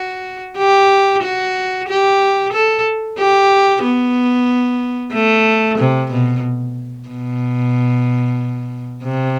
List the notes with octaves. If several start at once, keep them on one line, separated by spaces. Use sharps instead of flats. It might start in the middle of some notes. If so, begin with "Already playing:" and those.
Already playing: F#4
G4
F#4
G4
A4
G4
B3
A3
C3
B2
B2
C3